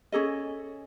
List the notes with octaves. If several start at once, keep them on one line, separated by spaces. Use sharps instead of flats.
C#4 G#4 A4 D#5